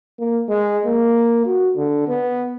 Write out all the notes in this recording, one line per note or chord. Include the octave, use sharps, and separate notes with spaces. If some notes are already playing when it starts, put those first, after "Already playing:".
A#3
G#3
A#3
F#4
D3
B3